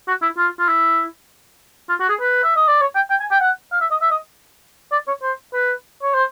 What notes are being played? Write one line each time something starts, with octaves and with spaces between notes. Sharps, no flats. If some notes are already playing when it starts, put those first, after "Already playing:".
F#4
E4
F4
F4
E4
F4
F#4
G#4
B4
E5
D#5
D5
C#5
G5
G5
G#5
G5
F#5
F5
E5
D#5
E5
D#5
D5
C#5
C5
B4
C#5
C5